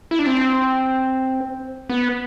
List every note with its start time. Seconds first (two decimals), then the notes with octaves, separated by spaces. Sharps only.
0.11 E4
0.19 D4
0.26 C4
1.89 B3